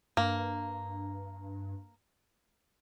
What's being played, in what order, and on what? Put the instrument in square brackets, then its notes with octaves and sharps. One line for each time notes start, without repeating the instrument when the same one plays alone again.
[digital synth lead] G2 [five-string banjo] A#3